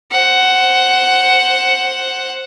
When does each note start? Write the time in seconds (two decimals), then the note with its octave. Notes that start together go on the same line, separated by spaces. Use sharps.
0.11 C5 F#5